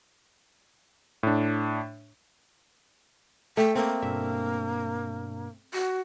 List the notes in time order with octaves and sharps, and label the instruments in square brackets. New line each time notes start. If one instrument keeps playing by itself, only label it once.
[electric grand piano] A2 D4
[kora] A3 [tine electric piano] A4 [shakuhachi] G5
[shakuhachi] A#3 [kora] C4
[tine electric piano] G2 B2 D4 [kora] E5
[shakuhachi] F#4